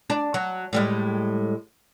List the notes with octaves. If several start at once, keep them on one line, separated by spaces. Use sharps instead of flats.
D4
F#3
A2 G3 G#3